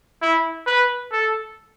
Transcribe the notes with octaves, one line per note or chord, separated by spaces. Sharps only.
E4
B4
A4